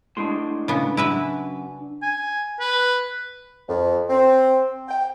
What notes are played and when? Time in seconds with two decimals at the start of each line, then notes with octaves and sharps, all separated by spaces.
0.17 A2 G#3 D4 C6
0.68 C#3 B3
0.97 F#2 E4 B4 E5
2.02 G#5
2.60 B4
3.68 F2
4.10 C4
4.88 G5